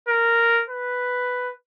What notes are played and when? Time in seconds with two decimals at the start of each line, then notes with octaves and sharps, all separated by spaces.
0.08 A#4
0.69 B4